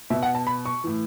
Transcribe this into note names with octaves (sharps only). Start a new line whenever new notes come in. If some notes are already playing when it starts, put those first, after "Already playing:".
B2 E5
F#5
A5
B5
C#6
A2 E3